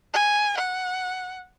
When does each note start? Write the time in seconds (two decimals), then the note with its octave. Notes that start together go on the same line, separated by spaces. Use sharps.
0.14 G#5
0.57 F#5